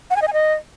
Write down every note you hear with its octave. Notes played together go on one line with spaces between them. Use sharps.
F#5
G#5
D#5
G#5
D#5